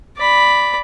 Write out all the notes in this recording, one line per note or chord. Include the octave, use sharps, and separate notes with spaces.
D5 B5